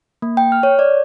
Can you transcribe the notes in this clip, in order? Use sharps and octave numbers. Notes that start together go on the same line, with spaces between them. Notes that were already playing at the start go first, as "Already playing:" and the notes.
A#3
G5
F6
C#5
D5